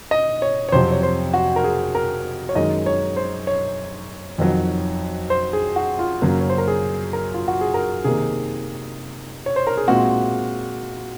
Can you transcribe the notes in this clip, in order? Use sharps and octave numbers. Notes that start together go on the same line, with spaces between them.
D#5
C#5
C#5
F2 C3 F#3 C5
C#5
C5
F#4
A#4
G#4
A#4
C#5
F#2 D#3 G#3 D#4 D#5
C#5
C5
C#5
F2 D#3 F#3
C5
G#4
F#4
F4
F#2 C#3 F#3 A#3
C#5
C5
A#4
G#4
A#4
F4
F#4
G#4
A#4
C3 D#3 A#3 G#4
C#5
C5
A#4
G#4
A#2 G#3 C4 F#4